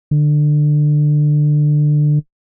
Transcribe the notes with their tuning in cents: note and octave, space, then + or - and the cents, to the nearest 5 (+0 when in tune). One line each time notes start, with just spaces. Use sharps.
D3 +20